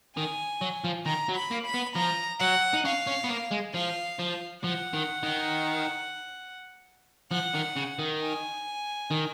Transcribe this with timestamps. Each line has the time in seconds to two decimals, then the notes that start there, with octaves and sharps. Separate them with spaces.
0.17 D#3 G#5
0.61 F#3
0.84 F3
1.06 D#3 A#5
1.29 F#3
1.36 B5
1.51 A#3
1.66 B5
1.74 B3
1.95 F3 A#5
2.40 F#3 F#5
2.73 D#4
2.85 C#4 F5
3.07 C#4
3.24 B3
3.29 A#3
3.52 G#3
3.74 F3 F5
4.19 F3
4.64 F3 F#5
4.93 D#3
5.23 D#3
7.31 F3 F#5
7.54 D#3
7.76 C#3
7.99 D#3
8.22 G#5
9.11 D#3